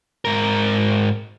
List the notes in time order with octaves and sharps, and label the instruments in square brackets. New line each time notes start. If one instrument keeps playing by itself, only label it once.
[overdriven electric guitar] G#2 A#4